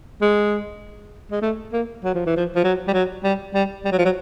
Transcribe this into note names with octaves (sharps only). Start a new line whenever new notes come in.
G#3
G#3
A3
A#3
F#3
F3
E3
F3
F3
F#3
G3
F#3
G3
G3
G3
F#3
F3
F#3